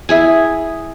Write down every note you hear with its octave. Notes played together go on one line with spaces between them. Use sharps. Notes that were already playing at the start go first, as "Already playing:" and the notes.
E4 G#4 G#5